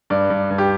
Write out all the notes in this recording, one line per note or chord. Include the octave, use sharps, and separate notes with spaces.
G2 D5
G2
G2
G4